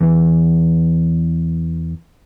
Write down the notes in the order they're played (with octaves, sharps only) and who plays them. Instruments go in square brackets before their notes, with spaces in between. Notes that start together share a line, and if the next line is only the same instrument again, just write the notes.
[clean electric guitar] E2 E3